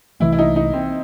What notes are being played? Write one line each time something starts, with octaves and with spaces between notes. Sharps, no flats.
C2 C3 E3 A3 E4
E4
D#4
D#4
C4